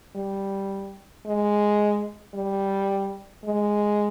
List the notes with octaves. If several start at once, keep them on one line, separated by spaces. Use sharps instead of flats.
G3
G#3
G3
G#3